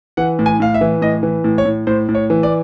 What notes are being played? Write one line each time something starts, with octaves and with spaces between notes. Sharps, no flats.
E3 F#5
A2
G#5
A2 F5
E5
E3
A2 D#5
E3
A2
C#5
A2
A2 C5
A2
C#5
E3
D5